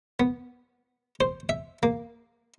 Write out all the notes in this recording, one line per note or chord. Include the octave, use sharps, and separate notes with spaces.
B3
C5
E5
A#3